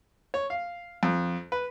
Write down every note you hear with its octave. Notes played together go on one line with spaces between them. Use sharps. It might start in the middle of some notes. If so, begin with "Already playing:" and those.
C#5
F5
F2
B4